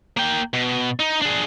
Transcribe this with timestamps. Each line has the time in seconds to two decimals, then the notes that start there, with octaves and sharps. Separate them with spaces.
0.17 A#3 G5
0.54 B2
1.00 D#4
1.22 D4 G#4